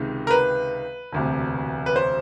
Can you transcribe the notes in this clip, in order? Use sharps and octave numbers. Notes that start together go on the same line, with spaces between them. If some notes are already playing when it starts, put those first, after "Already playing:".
Already playing: C#2 C3 D#3 G#3
A#4
B4
E1 D2 C3
B4
C5